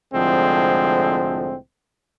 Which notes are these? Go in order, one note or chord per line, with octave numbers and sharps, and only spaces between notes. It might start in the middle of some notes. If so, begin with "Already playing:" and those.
C2 A2 D3 F3 G#3 C4